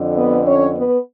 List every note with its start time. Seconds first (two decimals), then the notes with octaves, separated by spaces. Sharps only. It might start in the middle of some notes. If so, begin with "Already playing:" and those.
Already playing: F2 D3
0.16 B3 B4
0.46 C#4 C#5
0.75 B3 B4